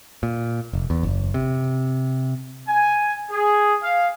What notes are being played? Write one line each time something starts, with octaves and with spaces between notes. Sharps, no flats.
A#2
F1
E2
F#1
C3
G#5
G#4
F5